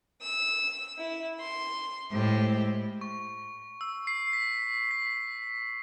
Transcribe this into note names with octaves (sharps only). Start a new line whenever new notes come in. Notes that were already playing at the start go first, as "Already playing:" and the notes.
E6
E4
C6
A2 G#3 E4 G4 C5
C#6
E6
C7
B6
B6